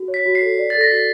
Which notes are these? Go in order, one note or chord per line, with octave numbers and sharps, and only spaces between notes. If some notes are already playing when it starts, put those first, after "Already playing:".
Already playing: F#4
C#5
B6
F#4
C7
A4
D5
A4 A6
A#6
F#4 B6